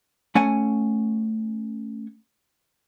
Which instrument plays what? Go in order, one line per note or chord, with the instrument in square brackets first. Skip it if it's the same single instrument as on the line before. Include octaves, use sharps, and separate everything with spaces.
[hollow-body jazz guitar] A3 C#4 F#5 G#5